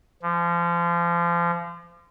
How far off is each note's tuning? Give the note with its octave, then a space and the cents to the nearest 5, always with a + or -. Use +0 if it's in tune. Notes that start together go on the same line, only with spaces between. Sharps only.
F3 -30